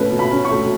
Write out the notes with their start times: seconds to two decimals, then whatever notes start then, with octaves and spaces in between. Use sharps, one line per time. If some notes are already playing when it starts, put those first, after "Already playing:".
Already playing: B2 A3 C#4 B4
0.12 B2
0.19 B5
0.31 C#4
0.45 C#6
0.51 A3